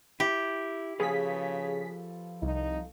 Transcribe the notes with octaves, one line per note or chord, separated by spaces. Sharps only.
E4 G4
C#3 F3 G#4 A4 B4 B6
C2 D#4